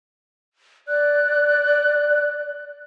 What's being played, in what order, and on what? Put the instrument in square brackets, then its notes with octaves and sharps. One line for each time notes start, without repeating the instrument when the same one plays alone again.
[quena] D5 [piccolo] F#6